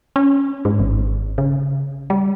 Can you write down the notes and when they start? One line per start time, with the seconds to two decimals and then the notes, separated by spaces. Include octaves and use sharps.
0.16 C#4
0.65 G#2
0.80 G#1
1.38 C#3
2.10 G3